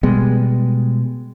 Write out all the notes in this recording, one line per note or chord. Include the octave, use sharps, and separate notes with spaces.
B2 G3 G#3 B3